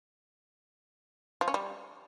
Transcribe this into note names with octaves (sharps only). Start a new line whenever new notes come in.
F3
C#4
G3